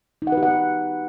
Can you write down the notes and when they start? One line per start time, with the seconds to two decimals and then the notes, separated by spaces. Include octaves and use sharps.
0.22 D#4
0.27 F#5
0.32 B4
0.37 G4
0.43 F#5